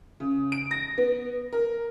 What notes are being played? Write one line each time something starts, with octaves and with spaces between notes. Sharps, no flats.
C#3
D7
A#6
B3
A#4